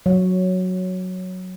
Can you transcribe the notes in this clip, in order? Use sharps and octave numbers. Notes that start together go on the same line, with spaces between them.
F#3